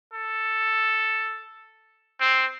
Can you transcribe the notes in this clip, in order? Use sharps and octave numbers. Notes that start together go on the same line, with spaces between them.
A4
C4